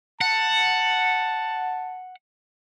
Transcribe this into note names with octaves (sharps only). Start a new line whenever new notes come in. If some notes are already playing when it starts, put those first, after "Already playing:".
F#5 A5